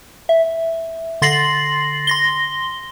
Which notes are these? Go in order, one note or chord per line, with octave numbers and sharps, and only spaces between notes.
E5
D3 C6 A6 A#6 C7 F#7
C6 A#6 G7